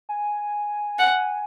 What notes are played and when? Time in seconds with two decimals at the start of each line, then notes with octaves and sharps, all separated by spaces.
0.09 G#5
0.99 F#5